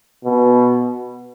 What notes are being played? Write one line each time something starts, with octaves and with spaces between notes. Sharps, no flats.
B2